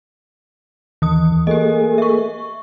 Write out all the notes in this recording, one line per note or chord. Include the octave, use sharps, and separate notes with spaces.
D#2 E3 D#6
A3 A#3 G4 G#4 D#5
E5 C#6